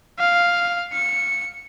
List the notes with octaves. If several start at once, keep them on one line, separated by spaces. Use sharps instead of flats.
F5
C#7